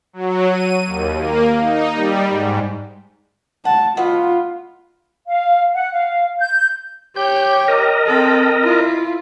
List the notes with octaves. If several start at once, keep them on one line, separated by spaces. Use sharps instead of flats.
F#3
D#7
D#2
A#3
D#4
G3
G#2
F#5 A5
B2 F#3 B3 F4
F5
F#5
F5
G6
G4 C#5 G6
A#4 D#5
C4 A4
E4 F4